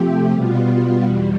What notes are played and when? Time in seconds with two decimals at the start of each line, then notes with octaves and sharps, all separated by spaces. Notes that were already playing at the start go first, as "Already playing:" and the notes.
Already playing: C3 F3 A3 C4 G4
0.31 B2 G3 B3 F4
1.02 E2 B2 G3